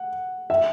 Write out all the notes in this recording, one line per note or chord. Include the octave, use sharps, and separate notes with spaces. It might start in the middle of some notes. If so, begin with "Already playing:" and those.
Already playing: F#5
E5